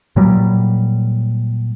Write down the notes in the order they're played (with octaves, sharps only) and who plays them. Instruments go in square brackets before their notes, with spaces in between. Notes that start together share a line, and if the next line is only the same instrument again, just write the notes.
[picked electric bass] A#2 F#3 G3